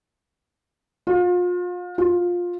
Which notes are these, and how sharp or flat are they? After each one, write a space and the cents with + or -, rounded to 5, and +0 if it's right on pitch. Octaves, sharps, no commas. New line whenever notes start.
F4 +35
F4 +15